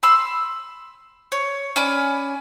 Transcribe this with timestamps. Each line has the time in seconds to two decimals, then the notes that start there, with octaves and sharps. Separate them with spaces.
0.03 B5 C6 E6
1.32 C#5
1.76 C#4 D5 G#5 B5